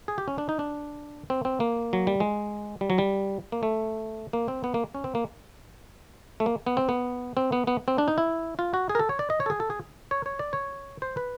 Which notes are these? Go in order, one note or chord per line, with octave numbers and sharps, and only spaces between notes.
G#4
G4
C#4
D4
D#4
D4
C4
C4
A#3
F#3
G3
G#3
G3
F#3
G3
A#3
A3
A#3
C4
B3
A#3
C#4
C4
A#3
A3
A#3
B3
C4
B3
C4
B3
B3
C4
D4
D#4
E4
F4
F#4
G#4
A#4
A4
C#5
D5
D#5
C#5
A4
G#4
A4
G#4
C#5
C#5
D5
C#5
C5
B4